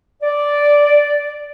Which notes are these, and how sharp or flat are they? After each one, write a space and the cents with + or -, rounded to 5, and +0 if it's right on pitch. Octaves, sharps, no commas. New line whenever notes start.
D5 -5